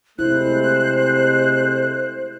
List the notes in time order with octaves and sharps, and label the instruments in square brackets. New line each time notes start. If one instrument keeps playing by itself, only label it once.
[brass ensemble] C3 G#3 A3 [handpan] E4 [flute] C5 [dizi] F#6